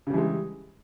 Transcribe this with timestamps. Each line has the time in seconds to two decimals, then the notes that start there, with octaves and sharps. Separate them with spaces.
0.07 C#3
0.10 G3
0.14 E3
0.17 G#3